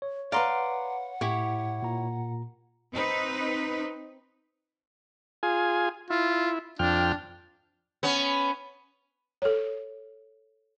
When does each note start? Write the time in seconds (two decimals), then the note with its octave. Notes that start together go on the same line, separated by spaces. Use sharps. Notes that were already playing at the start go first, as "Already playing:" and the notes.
0.02 C#5
0.32 B4 D5 F5 F#5 A#5 C6
1.21 A2 E4 G4 C#5
1.83 A#2 A#5
2.92 C4 D#4 B4
5.43 F4 G#4 G#5
6.10 E4 F4
6.79 F2 D4 G5 F6
8.03 B3 C#4
9.42 A4 C#5